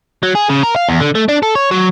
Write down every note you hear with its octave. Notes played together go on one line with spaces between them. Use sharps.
F#3
G#4
C#3
A#4
F5
E2
D3
A3
D4
A4
C#5
F#3